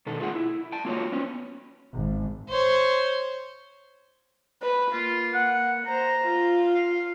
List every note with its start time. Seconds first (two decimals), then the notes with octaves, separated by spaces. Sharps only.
0.06 B2 D#3 A4
0.20 A3 F4 G#4 F#5
0.35 E4
0.72 G5 A5
0.85 A#3 F4 F#4 C#5
1.12 B3 C#4
1.93 G#1
2.49 C5 C#5
4.62 B4
4.92 A#3 F4
5.33 F#5
5.87 C5 A#5
6.24 F4
6.75 F5